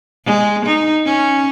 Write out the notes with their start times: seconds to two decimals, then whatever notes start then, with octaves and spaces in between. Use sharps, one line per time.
0.25 G#3
0.65 D#4
1.05 C#4